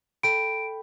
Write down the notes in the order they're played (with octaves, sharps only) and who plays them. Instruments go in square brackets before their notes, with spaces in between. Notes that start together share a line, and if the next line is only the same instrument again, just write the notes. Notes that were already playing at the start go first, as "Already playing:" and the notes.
[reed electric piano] A4 G5 B5 [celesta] D7